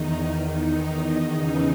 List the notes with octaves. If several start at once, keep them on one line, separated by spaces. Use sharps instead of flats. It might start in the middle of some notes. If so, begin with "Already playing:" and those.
Already playing: E2 D#3 D#4
D#4
E2 C#3 E3